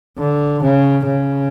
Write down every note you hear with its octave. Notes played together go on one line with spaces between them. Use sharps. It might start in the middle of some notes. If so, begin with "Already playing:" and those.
D3
C#3
C#3